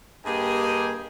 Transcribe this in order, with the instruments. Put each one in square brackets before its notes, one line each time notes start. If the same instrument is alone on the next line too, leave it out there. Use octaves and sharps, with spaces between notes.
[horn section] G2 A#3 G4 G#4 D#5 G#5